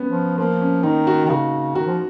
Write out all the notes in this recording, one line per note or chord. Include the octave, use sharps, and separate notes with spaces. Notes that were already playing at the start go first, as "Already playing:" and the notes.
Already playing: B3 C#4
F3
F3 A#3
C#4
D#3 D#4
F#4
D#3
C#3 F#4
D#3 F#4
F3